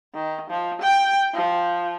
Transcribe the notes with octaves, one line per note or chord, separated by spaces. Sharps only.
D#3
F3
G5
F3